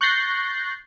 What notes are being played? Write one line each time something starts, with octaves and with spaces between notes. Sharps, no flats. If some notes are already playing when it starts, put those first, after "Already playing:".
C#6 F#6 G6 A6 A#6 C7